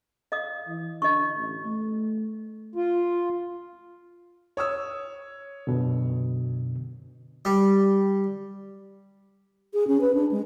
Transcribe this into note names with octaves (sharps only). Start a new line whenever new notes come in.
D#5 F5 D#6
E3
D3 D#5 C#6
A1
A3
F4
C#5 D#6 E6
F#2 B2 D3
G3
G#4
C#4
B4
D4
G#3